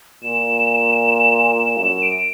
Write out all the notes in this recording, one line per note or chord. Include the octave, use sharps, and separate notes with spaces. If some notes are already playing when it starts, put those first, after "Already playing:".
A#2 E7
F#2 E7
D7